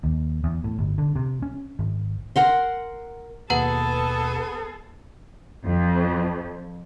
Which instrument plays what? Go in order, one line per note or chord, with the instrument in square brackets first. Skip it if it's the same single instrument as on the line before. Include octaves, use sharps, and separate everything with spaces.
[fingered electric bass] D#2
E2
A2
G1
D3
C3
C#4
G#1
[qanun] A#4 F#5 C6
[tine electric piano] D#2 B2 [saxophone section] B3 G#4 [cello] A4 [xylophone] B4 F#5 A#5
[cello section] F2